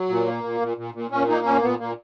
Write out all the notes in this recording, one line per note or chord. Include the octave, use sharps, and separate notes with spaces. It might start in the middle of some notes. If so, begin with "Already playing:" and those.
Already playing: F#3
A#2
A#3
A#2
A#2
A#2
A#2
A#2 C#4
A#3 D#4
A#2 C#4
A#2 B3
A#2 A#3